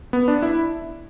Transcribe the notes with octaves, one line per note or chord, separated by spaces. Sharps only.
B3
D4
E4